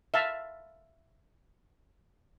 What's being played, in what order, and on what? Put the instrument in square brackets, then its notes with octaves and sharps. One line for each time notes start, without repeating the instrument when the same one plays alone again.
[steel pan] E5 F5 A5